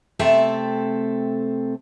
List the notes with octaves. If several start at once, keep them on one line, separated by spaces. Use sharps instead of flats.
C3 A3 C4 A4 E5 A5